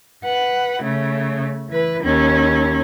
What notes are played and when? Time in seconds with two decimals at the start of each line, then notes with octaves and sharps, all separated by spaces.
0.24 B4 F#5
0.82 C#3 A3
1.69 E3 B4
2.04 D#2 C#4